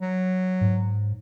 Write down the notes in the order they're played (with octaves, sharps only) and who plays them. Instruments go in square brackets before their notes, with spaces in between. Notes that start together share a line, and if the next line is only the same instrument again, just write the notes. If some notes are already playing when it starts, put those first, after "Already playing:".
[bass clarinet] F#3
[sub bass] G#2